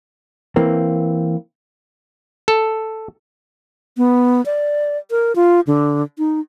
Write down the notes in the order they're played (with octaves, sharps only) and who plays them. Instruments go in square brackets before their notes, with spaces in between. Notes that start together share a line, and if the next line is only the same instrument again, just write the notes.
[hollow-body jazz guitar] E3 A#3 C4
[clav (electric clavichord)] A4
[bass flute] B3
D5
A#4
F4
D3
D#4